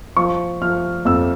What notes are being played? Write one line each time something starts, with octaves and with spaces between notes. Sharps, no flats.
F3 C#6
F3 F6
F2 E6